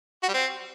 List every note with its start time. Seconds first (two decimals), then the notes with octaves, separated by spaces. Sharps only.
0.23 F#4
0.29 G3
0.34 C4